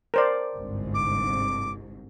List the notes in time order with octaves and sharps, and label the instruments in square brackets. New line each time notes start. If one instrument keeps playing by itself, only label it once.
[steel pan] A#4 C5 D5
[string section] G1 C2 G#2
[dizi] D6